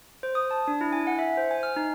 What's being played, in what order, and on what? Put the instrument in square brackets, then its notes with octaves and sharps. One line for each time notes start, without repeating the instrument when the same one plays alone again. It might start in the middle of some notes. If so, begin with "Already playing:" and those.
[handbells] C5
D#6
A5
D4
E4
G#5
F#5
E5
C5
G#5
F6
D#4